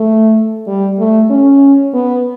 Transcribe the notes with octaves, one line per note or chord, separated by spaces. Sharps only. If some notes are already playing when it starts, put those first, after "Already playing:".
Already playing: A3
G3
A3
C#4
B3